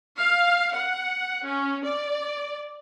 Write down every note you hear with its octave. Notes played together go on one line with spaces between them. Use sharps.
F5
F#5
C#4
D5